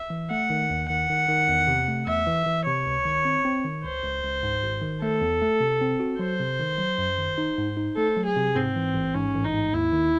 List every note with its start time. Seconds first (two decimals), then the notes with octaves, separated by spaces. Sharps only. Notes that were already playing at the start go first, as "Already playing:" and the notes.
Already playing: E5
0.10 E3
0.31 A3 F#5
0.50 D#3
0.70 D#2
0.89 D#3 F#5
1.10 D#3
1.29 D#3
1.49 E2
1.67 C3
1.88 A3
2.07 E2 E5
2.27 E3
2.46 E3
2.66 C3 C#5
2.86 C#2
3.05 D#3
3.25 C4
3.45 C4
3.65 D#3
3.84 C#2 C5
4.04 C#2
4.24 C#2
4.43 G#2
4.63 G#1
4.82 D#3
5.02 A3 A4
5.21 E2
5.42 A3
5.60 C3
5.81 C4
6.00 F#4
6.19 F#3 C5
6.40 C3
6.60 D#3
6.78 F#3
6.98 F#2
7.18 D#3
7.38 D#4
7.58 G#2
7.77 D#4
7.97 A3 A4
8.17 F#3
8.26 G#4
8.36 C3
8.55 G#2 C4
8.76 E3
8.94 A1
9.14 G#2 C#4
9.34 A1
9.44 D#4
9.54 G#2
9.73 D#2 E4
9.93 D#3